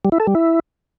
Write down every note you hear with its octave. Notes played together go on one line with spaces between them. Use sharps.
G3
E4
A4
G3
E4